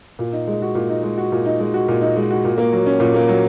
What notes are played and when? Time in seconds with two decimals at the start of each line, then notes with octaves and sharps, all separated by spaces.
0.19 A#2
0.33 D#4
0.47 G#3
0.62 F#4
0.75 A#2
0.89 D#4
1.03 G#3
1.18 F#4
1.32 A#2
1.45 D#4
1.60 G#3
1.74 F#4
1.88 A#2
2.02 D#4
2.17 G#3
2.30 F#4
2.45 A#2
2.58 A#3
2.73 F#3
2.86 C#4
3.00 A#2
3.14 A#3
3.29 F#3